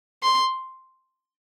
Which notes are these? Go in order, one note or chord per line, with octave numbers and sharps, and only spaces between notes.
C6